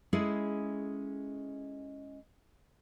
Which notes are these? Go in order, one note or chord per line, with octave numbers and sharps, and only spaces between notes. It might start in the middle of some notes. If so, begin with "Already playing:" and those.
G#3 C#4 E4 G#4 A4